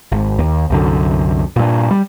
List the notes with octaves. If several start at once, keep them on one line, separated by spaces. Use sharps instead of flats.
G#1
D#2
C2 F#2 D3
G2 A#2
G3